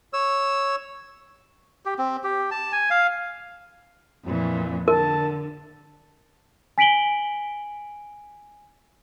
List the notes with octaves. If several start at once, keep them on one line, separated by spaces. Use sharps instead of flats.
C#5 E6
G4
C4
G4
A5
G#5
F5
F2 A#2 E3
D3 A#4 A5
G#5 B6 D7 F#7 G7